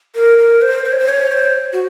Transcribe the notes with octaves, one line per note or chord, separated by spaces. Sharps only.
A#4
A#4
C5
C5
C#5
C5
C#5
C5
F#4